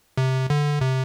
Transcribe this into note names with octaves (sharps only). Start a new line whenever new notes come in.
C3
D3
C3